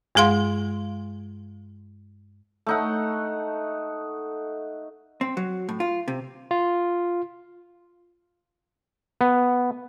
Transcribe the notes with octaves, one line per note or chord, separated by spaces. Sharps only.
G2 G#3 G#4 F5 C6
A3 D#4 F#5
C4
F#3
A2
F4
C3
F4
B3